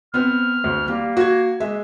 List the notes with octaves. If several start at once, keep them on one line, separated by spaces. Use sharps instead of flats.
B3 C4 F6
D2
G3 A#3
F#4 G#6
G#3 E5